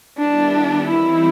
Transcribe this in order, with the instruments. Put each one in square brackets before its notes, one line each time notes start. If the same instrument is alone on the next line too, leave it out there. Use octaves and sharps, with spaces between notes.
[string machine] D#3 G3 B3 E4 G4 [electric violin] D4
[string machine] E3 G3 C4 D#4 [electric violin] E4